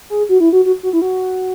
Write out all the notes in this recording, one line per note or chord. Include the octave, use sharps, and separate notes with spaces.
G#4
F#4
E4
F#4
F#4
F#4
E4
F#4